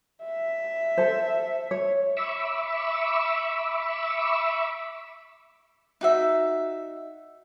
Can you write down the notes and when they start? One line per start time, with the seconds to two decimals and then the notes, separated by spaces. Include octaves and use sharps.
0.25 E5
0.97 A4 C5
1.71 C#5
2.17 E5 B5 C#6 D6 E6
6.01 D#4 F#4 E5